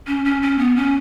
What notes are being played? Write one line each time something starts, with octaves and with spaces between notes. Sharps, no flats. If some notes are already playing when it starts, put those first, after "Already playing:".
C#4
C#4
C#4
B3
C#4